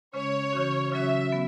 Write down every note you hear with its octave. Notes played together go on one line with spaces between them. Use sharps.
C#3 G#3 C#4 C#5
C#3 E3 C#4 F#4
C#3 F#3 C#4 F#4 E5
F#3 B3